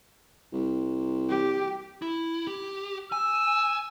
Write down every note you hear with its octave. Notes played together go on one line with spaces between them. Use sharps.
C2
G4
E4
G4
G#5 E6